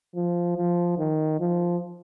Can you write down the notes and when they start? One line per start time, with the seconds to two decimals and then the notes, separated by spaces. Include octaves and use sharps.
0.15 F3
0.57 F3
0.98 D#3
1.40 F3